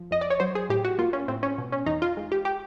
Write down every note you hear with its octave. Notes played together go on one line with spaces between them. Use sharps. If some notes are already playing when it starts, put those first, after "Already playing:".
Already playing: F3
F2 D#5
D5
C#5
F#3 C5
G#4
A2 G4
F#4
A#3 F4
C#4
A2 C4
C#4
B2
C#4
E2 D#4
F4
G#3
G4
G4